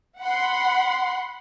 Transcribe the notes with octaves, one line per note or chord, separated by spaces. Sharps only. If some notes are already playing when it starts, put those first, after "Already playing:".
F#5 B5 C6